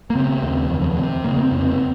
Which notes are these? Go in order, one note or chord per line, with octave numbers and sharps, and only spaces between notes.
A#3
C#3 C4
D#2
F2
C3
C#3 A#3
A#3
C4
F2
C4